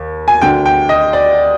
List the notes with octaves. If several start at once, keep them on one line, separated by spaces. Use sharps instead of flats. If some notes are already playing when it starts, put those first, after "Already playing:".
Already playing: D#2
G#5
D2 D3 G5
G5
D#5
D5